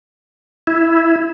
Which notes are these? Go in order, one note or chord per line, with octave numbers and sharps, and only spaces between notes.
E4